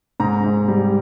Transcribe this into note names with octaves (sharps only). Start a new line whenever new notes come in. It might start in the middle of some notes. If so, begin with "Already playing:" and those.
G#2 A#5
G#2
G3